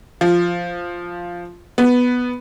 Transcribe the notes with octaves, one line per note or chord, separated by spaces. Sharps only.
F3
B3